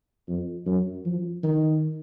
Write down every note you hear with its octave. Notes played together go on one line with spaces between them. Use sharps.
F2
F#2
F3
D#3